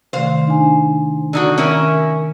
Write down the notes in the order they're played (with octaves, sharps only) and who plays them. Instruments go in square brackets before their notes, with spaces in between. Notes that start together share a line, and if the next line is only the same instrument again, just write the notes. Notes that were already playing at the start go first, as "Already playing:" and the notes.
[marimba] C3 D#3 A3 [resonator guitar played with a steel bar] C5 F5
[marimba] D4 D#4 G#5
[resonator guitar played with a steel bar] D3 D#4 F#4
[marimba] D#3 [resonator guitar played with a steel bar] C#4 E4 A#4